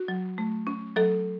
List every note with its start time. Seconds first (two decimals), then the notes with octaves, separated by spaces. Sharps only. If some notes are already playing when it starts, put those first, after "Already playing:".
Already playing: F#4
0.08 F#3
0.38 A3
0.67 C#4
0.96 F#3 A4